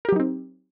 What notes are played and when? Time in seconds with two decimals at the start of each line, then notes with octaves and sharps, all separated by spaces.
0.05 A#4
0.09 G4
0.12 F#3
0.16 D#4
0.20 C4